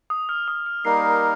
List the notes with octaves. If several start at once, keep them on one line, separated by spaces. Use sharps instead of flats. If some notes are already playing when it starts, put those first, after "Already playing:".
D#6
F6
D#6
F6
G3 A#3 D#4 A#4 C7